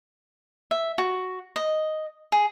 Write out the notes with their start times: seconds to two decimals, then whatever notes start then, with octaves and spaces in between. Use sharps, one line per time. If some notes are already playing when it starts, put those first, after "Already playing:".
0.71 E5
0.98 F#4
1.56 D#5
2.32 G#4